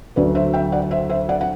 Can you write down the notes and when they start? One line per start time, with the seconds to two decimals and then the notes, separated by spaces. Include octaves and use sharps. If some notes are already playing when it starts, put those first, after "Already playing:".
0.16 D2 D3 F#3 B4 D5
0.35 C5 E5
0.54 E5 G5
0.72 D5 F#5
0.91 C5 E5
1.10 C5 E5
1.29 D5 F#5
1.41 F#5